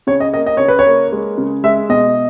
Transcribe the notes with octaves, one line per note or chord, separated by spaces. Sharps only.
C#3 C#5
D#5
A#3 D#5
D#5
C#3 C#5
B4
C#5
A#3
G#3
C#3
G#3 E5
B2 D#5